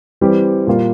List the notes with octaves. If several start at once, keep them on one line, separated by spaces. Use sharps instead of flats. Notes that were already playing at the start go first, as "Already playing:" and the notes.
E3 G3 C4 G4
A#2 G3 A#3 F4